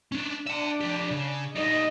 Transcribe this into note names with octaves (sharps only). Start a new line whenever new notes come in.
C#4 D4
D4 E5 G5
F3 G4
C#3
G3 D#4 D#5